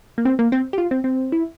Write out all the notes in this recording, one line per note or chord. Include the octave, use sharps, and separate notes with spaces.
A#3
C4
A#3
C4
G4
F4
C4
C4
E4